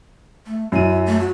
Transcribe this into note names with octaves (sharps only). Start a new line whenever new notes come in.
A3
F#2 E4 D#7
A3
F#4